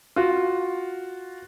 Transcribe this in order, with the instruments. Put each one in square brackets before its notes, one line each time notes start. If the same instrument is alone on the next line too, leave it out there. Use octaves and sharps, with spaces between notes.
[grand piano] F4 F#4